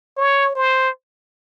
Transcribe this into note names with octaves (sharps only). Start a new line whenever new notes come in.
C#5
C5